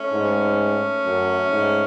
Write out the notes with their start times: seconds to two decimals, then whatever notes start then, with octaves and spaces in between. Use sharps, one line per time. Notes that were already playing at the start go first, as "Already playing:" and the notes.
Already playing: A3 C#4
0.12 G#2
1.05 F#2
1.50 G#2